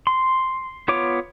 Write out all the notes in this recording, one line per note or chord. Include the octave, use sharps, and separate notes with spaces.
C6
B3 F4 C#5 D6